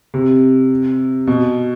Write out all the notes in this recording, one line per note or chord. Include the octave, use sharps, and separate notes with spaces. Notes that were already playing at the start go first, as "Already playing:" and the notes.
C3
B2